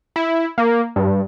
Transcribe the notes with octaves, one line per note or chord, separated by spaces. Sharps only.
E4
A#3
G2